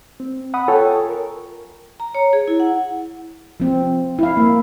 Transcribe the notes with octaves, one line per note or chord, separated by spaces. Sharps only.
C4
F#5 B5 D#6
F4 A4 C#5 G5 G#5 C#6
A#4
A#5
C#5
G#4
E4
F#5
F3 C4
E4 F5
A#3